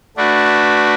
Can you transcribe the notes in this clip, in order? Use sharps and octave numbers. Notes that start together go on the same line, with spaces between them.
A3 D4 F#4 B4